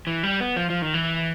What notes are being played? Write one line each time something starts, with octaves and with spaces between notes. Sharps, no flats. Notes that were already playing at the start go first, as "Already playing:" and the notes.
E3
G3
B3
F3
F3
D#3
E3